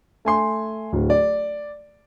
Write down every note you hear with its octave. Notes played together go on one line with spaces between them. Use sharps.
A3 G#5 C6
D1
D5